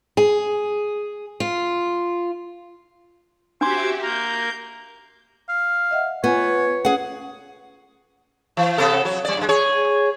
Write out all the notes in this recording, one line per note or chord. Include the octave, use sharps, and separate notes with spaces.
G#4
F4
D4 F#4 G4 C5 E5 C6 D6 G#6
A#3 A#4 G6
F5
D#5 E5 F#5
B3 F4 C#5 G#5
C#4 G#4 F#5
E3
C3 B3 A4
F#3
G3 D5
G2 G#3
G#4 C#5